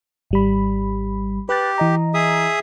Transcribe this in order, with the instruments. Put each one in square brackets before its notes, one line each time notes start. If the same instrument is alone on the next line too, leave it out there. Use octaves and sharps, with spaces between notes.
[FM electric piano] G#1 G3 B5
[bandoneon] G4 [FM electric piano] B4 F#6 A6
[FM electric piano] E3 D#5 A#5
[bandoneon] G#4 E5 D#6